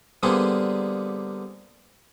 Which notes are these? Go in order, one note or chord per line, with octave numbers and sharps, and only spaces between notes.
D3 G3 A#3 B3 G#4 C5